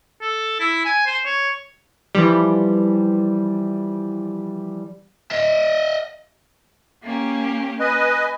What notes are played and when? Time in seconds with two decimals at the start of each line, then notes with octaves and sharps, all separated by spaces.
0.21 A4
0.60 E4
0.85 G#5
1.06 C5
1.25 C#5
2.15 E3 F3 G3
5.31 D#5 E5
7.03 A#3 C#4 G4
7.80 B4 D#5 G#5